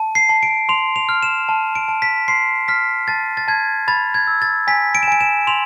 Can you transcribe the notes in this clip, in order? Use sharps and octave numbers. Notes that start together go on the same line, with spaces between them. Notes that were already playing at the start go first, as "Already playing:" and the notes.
Already playing: A5
C7
A5
D7
C6 F7
F7
F6
E7
A5
D7
A5
B6
C6 C7
F6 B6
A5 A6
A6
A5 G#6
B5 A6
G#6
E6
A6
G#5 B6
D7
E7
G#5 D7
E7
C6 F7